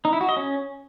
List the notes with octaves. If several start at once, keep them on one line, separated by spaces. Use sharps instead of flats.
D#4
E4
F#4
D#5
C#4